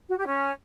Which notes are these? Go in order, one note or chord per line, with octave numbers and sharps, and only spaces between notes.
F#4
G4
C#4